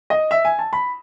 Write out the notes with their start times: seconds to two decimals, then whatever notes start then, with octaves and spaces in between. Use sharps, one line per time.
0.10 D#5
0.31 E5
0.45 G#5
0.59 A5
0.73 B5